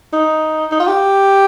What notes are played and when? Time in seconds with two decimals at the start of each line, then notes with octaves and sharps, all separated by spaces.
0.13 D#4
0.72 D#4
0.80 F4
0.88 G4